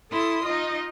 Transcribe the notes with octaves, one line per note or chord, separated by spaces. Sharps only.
E4 A4 C6 D#6
D#4 F4 D#5